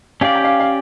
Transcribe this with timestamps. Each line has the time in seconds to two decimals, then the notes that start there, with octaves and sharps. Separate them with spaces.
0.21 C#4 G4 D5 F5
0.35 G5
0.44 F5
0.60 F5